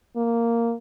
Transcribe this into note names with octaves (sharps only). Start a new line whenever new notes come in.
A#3